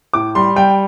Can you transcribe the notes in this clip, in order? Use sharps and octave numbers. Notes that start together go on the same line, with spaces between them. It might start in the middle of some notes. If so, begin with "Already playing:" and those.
A2 D6
G3 C6
G3 G5